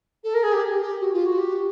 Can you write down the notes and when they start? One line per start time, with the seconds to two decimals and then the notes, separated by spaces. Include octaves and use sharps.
0.24 A4
0.34 A#4
0.43 G#4
0.53 G4
0.82 G4
1.01 F#4
1.13 F4
1.26 F#4
1.39 G4